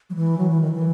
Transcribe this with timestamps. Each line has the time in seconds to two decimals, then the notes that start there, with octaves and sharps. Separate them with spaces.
0.10 F#3
0.15 E3
0.38 F#3
0.49 E3
0.61 D#3
0.72 E3